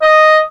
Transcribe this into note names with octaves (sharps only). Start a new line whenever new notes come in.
D#5